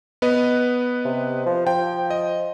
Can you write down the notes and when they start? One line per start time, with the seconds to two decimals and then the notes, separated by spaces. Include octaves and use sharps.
0.22 B3 B4 D#5
1.05 C3
1.46 F3
1.67 F3 G5
2.10 D#5